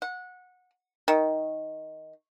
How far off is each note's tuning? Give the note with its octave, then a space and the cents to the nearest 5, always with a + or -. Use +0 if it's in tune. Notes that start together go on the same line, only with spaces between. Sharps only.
F#5 -20
D#3 +10